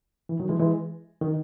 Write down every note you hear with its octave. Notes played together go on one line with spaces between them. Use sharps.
E3
D#3 F#3
E3 G#3
E3 G#3
D#3